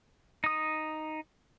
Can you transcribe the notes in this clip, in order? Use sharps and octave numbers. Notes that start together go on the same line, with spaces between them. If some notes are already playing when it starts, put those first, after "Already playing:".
D#4 D#6